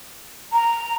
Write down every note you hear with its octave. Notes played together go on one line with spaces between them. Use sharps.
A#5